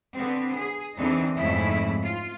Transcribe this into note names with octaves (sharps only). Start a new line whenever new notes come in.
D3 B3 C4
G#4
E2 D3 E3 C4 D#4
F2 G#2 C#3 A3 E4
F4